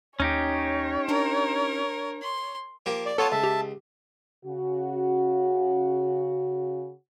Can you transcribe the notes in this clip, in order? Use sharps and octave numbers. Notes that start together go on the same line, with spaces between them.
D#2 C#4 D#4 G4 C#5
D4 A#4
C6
F3 A#3 G4
D5
B3 F4 A4 C#5 A5
C#2 E5 A5
G4
C#3 F#4